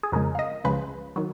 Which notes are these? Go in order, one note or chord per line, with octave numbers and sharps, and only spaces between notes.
G#4
F2 C#3 G#3 A#4
F5
D#5
C#2 C#3 F3 G#3 B4
D#3 F#3